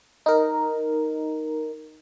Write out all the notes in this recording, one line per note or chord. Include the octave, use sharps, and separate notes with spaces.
D#4 A#4